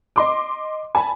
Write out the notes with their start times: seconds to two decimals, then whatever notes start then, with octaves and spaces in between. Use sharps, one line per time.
0.16 D#5 C6 D6
0.95 G#5 A5 B5